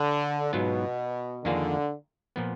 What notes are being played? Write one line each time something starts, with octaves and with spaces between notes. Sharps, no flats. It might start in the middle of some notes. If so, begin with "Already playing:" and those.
Already playing: D3
G#2 B2 F#3 B3 F4
F2 D3 D#3 A#3 F4 G#4
A#2 F3 B3